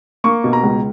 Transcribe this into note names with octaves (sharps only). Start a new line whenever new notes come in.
A#3 C#6
B2
A#5
C#2